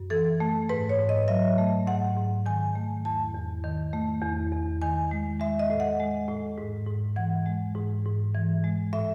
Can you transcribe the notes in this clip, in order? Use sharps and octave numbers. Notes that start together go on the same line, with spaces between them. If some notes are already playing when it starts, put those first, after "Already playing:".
Already playing: F#2
E3 A4
A3
G#2 B4
C#5
G#2
D#5
F#3 E5
A3
G#2 F#5
G#2
D#3 G#5
A3
E2 A5
E2
D#3
A3
E2
E2
D#3 G#5
G#3
G#3 E5
D#5
A2
F#5
G#3
A2
G#2
G#2
E3 F#5
G#3
G#2
G#2
E3
G#3
A2 E5